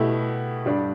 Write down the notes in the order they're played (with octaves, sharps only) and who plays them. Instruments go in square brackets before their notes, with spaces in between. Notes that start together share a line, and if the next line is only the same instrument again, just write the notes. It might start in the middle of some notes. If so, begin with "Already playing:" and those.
Already playing: [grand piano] B2 A3 E4 G4
G2 G3 D4